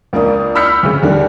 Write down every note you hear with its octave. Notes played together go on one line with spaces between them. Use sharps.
C#2 A#3 D4 D#6
B5 E6 F6 G6 B6 C#7
D2 C#3
D#2 D3 G3 A3